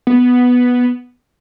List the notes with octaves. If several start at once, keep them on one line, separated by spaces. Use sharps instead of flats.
B3